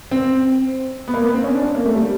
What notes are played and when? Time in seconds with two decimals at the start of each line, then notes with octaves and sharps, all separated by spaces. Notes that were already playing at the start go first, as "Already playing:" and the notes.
0.11 C4
1.08 B3
1.14 A#3
1.23 B3
1.34 C4
1.44 C#4
1.54 D4
1.64 C4
1.75 A#3
1.86 A3
1.96 G3